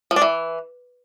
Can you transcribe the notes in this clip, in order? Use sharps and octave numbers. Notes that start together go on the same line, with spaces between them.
F3
D4
E3